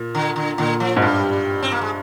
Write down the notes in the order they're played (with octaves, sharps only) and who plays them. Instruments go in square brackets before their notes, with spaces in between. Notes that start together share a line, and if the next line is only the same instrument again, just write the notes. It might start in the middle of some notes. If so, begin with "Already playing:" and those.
Already playing: [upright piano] A#2
[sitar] D3
D3
[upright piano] A#2 [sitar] D3
[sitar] F3
[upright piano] G#2
[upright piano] G2 [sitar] G3
[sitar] C4
A#3
G#3